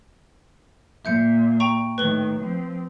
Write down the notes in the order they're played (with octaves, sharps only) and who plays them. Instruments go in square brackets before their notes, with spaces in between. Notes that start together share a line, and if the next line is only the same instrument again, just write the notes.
[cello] A#2 [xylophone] E5 G6 C#7
[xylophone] G5 A#5 C#6
[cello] A2 D#3 [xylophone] B4 G7
[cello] F3 C4